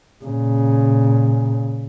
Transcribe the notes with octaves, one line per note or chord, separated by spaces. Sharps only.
A#2 C#3